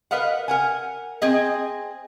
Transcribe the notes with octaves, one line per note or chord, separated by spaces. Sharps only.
A#4 B4 D#5 F5 F#5
A#4 F#5 G#5
C4 G#4 D#5